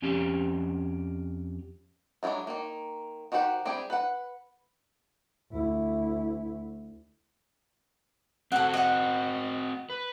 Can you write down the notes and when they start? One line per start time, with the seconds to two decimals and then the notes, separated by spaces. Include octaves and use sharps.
0.02 F2 C#4 G4 F5
2.23 F#3 G#3 A3 D4 E4
2.47 D#3 A#3
3.32 D#3 F#4 G4 C5 F#5
3.65 G3 C4 E4 G4 G#4
3.90 B4 F#5
5.52 D2 E4
8.52 C4 F#4 A4 F#5
8.74 D#5 F#5
9.90 B4